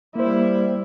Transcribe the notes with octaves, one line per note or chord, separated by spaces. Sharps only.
G3 A#3 E4 C5